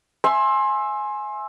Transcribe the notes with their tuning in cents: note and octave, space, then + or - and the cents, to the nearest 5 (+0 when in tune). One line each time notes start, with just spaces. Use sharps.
E5 +0 G#5 +10 C6 +25